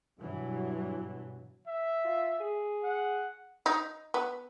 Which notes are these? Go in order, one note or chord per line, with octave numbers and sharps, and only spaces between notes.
G2 B2 E3 F#3
E5
F4
G#4
F#5
D#4
B3